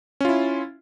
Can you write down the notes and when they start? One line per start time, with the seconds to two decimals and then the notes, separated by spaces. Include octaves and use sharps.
0.21 C#4
0.25 F4
0.29 E4